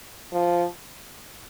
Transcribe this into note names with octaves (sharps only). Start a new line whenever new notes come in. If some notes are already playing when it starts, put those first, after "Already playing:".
F3